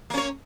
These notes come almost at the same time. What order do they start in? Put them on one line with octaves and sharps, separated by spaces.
A#3 C#4 C#5